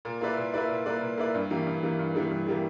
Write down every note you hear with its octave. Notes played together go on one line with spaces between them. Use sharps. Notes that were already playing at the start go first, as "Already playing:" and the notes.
A#2
A#3 E4 B4 D5
A#2
A#3 E4 B4 D5
A#2
A#3 E4 B4 D5
A#2
A#3 E4 B4 D5
G2
E3 G3 A#3
G2
E3 G3 A#3
G2
E3 G3 A#3
G2
E3 G3 A#3